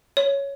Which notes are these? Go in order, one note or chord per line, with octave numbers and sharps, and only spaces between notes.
C#5